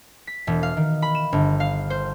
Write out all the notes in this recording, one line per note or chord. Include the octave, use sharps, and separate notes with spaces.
B6
E1
F5
D#3
B5
E7
G1
F5
C5